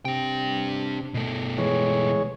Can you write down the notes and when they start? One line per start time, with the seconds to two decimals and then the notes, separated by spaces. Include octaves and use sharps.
0.05 C3 D4 G5
1.14 B2 A3
1.58 E3 G#3 C#5